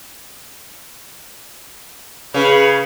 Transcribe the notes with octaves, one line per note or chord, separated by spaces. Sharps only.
C#3 B4